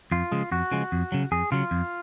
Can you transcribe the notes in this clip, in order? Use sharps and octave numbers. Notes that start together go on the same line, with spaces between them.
F2 F4
C#3 F3 G#3
F2 F#4
C#3 F3 G#3
F2
C#3 F#3
F2 G#4
C#3 F#3 F4
F2